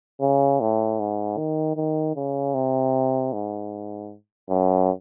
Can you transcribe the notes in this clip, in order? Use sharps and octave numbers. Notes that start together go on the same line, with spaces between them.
C#3
A2
G#2
D#3
D#3
C#3
C3
G#2
F#2